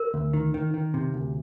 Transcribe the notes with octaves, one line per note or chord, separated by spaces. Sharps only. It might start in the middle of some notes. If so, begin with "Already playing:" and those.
Already playing: A#4
D2
D#3
D#3
D#3
C3
D2